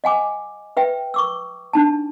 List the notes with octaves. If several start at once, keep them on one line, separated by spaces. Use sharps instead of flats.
D#5 F#5 G#5 D6
B4 E5 G5
C#6 D6 E6
D4 D#4 A5